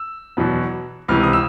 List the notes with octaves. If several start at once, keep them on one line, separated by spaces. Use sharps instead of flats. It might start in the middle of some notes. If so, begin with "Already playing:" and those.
Already playing: E6
E2 B2 F#3 B3
C#2 C3 E3 F6
D#6
E6